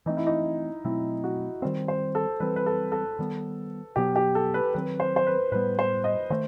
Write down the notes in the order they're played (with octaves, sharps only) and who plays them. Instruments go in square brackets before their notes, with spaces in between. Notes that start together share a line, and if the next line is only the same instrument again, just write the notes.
[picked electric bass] E3 A3 C4 [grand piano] D#4
[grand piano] E4
D#4
[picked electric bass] B2 F#3 A3 C4 [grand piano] E4
[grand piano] F#4
[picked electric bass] D#3 G3 C4 [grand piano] C5
[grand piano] C5
A4
[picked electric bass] E3 G3 C4 [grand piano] B4
[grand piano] B4
A4
A4
[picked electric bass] D#3 G3 B3
[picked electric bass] B2 F#3 B3 [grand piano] G4
[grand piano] G4
A4
B4
[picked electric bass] D#3 F#3 C4 [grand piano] B4
[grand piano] C5
C5
B4
[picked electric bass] A2 G3 B3 [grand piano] B4
[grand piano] C5
D#5
[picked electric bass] D#3 A3 [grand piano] C5